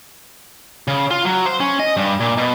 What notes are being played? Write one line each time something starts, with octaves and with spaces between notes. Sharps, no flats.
C#3
F4
F#3
C5
C#4
D#5
G2
A#2
B2